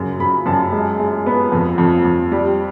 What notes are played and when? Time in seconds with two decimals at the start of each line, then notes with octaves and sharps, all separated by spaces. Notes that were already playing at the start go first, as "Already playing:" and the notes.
Already playing: F#2 C#3
0.20 F#2 B5
0.46 F#2 A5
0.72 G#3
1.00 G#3
1.26 B3
1.52 F2
1.78 F2
2.04 F2
2.32 G3